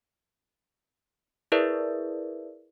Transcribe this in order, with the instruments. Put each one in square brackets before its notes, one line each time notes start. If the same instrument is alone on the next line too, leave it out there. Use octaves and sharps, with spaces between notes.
[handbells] E4 G#4 A#4 B4 D5 E5